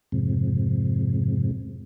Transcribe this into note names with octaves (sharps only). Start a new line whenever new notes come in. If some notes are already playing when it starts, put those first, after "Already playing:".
F2 G#2 C3